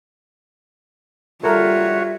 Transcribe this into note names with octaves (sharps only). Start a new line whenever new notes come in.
G3 F4 F#4 A4 A#4 C#5 E5